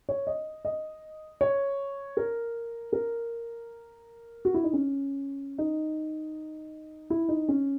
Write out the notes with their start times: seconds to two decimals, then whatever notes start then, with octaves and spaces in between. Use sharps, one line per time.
0.09 C#5
0.27 D#5
0.65 D#5
1.41 C#5
2.17 A#4
2.93 A#4
4.45 F#4
4.54 E4
4.64 D#4
4.73 C#4
5.58 D#4
7.10 E4
7.29 D#4
7.48 C#4